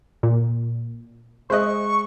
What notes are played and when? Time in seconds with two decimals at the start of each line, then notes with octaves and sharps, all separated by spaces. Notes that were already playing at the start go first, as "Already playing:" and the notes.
0.23 A#2
1.50 G#3 C5 D#5 E5 C#6 F#6